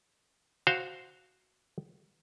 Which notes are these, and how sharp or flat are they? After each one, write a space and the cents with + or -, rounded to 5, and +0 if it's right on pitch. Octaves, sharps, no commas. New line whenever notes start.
F#4 +0 C5 +0 F5 +0